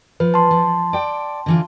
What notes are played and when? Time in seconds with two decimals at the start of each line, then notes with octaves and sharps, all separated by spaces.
0.20 F3 B4
0.34 A5 C6
0.51 F3
0.93 D5 G5
1.46 D3 E3 F4